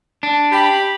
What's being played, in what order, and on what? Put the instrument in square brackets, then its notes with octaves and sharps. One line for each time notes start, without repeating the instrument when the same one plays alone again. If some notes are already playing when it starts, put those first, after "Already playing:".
[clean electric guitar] D4
[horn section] G4 B5